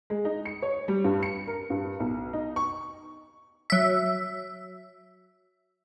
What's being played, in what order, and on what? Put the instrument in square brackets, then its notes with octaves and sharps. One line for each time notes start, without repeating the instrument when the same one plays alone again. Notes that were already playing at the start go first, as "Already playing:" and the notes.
[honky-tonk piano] G#3
D#4
C#7
C#5
G3
G2
C#7
A#4
G2
B1
D#4
C#6
[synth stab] F#3 E5